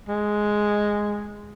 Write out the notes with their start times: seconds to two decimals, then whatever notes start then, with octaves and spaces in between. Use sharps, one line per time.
0.08 G#3